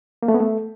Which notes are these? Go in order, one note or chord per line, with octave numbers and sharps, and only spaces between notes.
A#3
A3
B3
A3